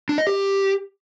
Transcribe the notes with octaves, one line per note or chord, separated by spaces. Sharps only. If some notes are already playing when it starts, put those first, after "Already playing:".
D4
D#5
G4